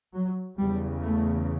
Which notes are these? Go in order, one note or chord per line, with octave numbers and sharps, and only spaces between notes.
F#3
E2 C#3 G3
A3